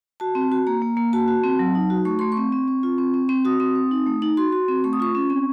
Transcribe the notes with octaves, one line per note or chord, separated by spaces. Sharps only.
F#4 A5
C4
F#4
A#3 A#5
A#3
A#3
F#4 A5
F#4
C4
F#3
D#4
F#4
A3 C#6
A3 C6
C#6
C4
C4
C4
F4
C4
C4
C4
F#4 D#6
C4
C4
D#4
A3
D#4
F#4 C6
F#4
C4
A3 C#6
D#6
F4 C#6
C#4
C4